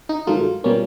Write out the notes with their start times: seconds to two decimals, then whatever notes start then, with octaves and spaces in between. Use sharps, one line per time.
0.09 D#4
0.27 G#2 D#3 F#3 A3 F4
0.64 B2 G3 A#3 C#4